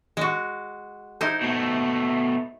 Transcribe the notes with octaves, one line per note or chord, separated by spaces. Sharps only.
G#3 F#4
D#4 E4 C5
B2 A3